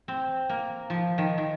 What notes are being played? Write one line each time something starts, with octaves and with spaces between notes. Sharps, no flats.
C4
A#3
F3
D#3
D#3